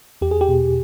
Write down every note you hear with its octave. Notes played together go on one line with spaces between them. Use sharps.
E2 G4
G#4
G4
B2